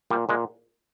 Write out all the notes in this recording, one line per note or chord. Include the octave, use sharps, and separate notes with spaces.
A#2 G3
A#2 G#3